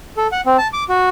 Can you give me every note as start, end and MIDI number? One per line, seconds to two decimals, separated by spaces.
0.17 0.27 69
0.32 0.41 78
0.46 0.57 60
0.58 0.68 81
0.73 0.84 86
0.89 1.09 66